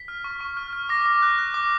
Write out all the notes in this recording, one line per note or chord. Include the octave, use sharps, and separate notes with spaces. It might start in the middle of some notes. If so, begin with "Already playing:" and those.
Already playing: B6
F6
C#6
C#6
F6
F6
D6 A#6
D6
F#6
F#6
D6